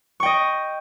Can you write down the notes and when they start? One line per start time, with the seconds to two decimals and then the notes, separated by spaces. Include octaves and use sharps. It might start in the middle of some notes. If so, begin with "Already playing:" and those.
0.20 C#6
0.23 G5
0.26 D#5